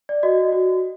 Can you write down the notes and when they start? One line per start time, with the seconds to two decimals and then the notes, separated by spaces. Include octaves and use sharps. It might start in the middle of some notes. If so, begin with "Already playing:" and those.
0.09 D5
0.23 F#4 D#5
0.52 F#4